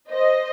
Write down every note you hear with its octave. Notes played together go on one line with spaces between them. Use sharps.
C5 D#5